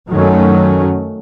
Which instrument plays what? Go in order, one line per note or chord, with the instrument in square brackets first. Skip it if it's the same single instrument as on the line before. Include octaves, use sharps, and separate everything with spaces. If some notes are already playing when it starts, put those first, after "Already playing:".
[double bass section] F#2 D#3 F#3 A3 C#4